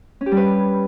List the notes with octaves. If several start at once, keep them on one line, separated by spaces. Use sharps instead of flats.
C#4
G4
G3
B4